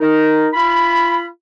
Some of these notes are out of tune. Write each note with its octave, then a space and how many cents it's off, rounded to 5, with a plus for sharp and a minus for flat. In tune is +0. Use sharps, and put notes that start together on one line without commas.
D#4 +0 A#4 +0
F4 -30 B5 +0